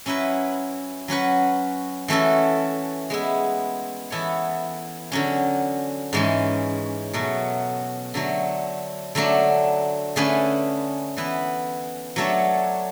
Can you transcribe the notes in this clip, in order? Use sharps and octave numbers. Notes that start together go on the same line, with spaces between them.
F#3 C#4 E4 B4
F#3 C#4 F#4 B4
E3 A3 C#4 F#4 A4
G#3 B3 E4
E3 B3 E4 A4 C#5
D3 F#3 C#4
G#2 E3 G#3 C#4
B2 F#3 A3
D3 F#3 A3
D3 F#3 A3 D4
D3 A3 C#4 G#4 B4
E3 B3 E4 B4
F#3 A3 D4 A4 C#5